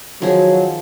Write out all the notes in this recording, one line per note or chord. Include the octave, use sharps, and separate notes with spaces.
D#3 F3 F#3 G#4